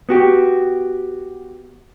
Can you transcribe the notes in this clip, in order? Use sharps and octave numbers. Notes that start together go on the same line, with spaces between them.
B3 F#4 G4